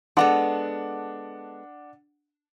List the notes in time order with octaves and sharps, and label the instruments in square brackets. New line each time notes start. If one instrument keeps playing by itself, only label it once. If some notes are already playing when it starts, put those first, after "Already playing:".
[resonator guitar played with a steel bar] G#3 B3 A4 [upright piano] D4 F#5 D6